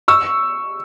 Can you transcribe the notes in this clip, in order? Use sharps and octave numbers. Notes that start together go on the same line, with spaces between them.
C#6 E6